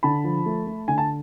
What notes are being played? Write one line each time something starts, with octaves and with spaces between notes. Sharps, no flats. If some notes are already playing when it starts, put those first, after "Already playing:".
D3 A5 B5
F3
A3
A3
D3 G#5
A5